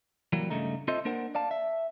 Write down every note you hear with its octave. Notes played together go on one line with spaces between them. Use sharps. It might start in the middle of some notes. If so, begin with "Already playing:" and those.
E3 F#3 G3 A#3
G2 C#3 A3 D#4
C4 F4 A4 C5 D#5 E5
A#3 D4 A#4 C5 F#5
D5 F5 A5
E5